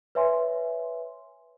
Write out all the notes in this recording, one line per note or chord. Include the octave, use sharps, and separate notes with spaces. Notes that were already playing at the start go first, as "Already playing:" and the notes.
B4 C#5 E5 G#5 C6